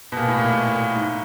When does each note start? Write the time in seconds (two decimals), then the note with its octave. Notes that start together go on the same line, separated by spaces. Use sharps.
0.12 B2
0.17 A#2
0.28 A2
0.39 A#2
0.51 A2
0.95 G#2